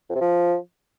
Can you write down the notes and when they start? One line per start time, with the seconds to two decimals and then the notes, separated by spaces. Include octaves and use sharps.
0.09 F2
0.15 C3
0.21 F3